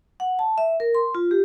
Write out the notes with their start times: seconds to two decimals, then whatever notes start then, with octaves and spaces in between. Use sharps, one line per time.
0.20 F#5
0.39 A5
0.58 E5
0.80 A#4
0.95 C6
1.15 F4
1.31 G4